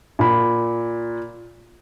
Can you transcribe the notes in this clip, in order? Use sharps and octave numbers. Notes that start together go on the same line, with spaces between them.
A#2 B5